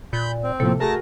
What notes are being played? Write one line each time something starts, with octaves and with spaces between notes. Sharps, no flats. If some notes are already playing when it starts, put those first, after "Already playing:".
A#2 B5 G6
C4
A2 C3 F3 A#3 A4
A3 F#4 G#4 A#4 A5 A#6